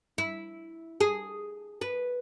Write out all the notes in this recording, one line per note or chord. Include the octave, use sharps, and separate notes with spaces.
E4
G#4
B4